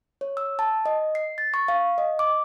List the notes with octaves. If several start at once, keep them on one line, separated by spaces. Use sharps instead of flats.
C#5
E6
A5
D#5
C7
A6
C#6
F5
D#5
D6